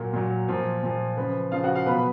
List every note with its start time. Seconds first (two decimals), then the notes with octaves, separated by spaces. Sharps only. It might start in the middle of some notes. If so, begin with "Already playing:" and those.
Already playing: A#2 F#3 A#4
0.13 A#2 F#3
0.48 A#2 F3
0.83 A#2 F3
1.17 C#3 F3 B4
1.52 C#3 F3 F4 F5
1.64 F#4 F#5
1.75 F4 F5
1.86 B2 B4 B5
1.90 F#3
1.96 B5